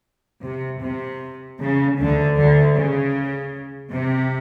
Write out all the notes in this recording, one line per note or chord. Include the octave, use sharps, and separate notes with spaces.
C3
C3
C#3
D2 D3
D2 D3
C#3
C3